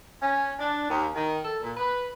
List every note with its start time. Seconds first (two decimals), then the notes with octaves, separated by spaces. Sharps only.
0.22 C#4
0.58 D4
0.88 D#2
1.15 D#3
1.44 A4
1.62 A#2
1.76 B4